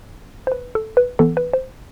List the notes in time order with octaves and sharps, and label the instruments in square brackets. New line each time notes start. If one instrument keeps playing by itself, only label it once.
[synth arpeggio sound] C5
B4
A4
B4
E3 B3 A4
B4
C5